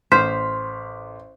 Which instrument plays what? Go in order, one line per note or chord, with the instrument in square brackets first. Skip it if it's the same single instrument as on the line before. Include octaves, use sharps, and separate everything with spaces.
[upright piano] A1 F6 B6 [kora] C5 [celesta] C6